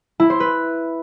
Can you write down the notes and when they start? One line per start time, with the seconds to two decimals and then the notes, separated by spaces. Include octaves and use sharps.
0.20 E4
0.30 C5
0.40 B4